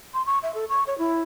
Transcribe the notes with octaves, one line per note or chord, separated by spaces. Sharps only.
C6
C#6
E5
A4
C#6
C#5
E4